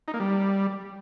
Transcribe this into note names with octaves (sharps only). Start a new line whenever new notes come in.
D#4
A#3
G3